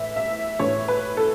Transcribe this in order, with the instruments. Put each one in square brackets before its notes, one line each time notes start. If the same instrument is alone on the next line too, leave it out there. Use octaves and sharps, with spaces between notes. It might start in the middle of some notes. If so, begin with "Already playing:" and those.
Already playing: [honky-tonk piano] A2 E3 E5
E5
A2 E3 C#5
B4
A4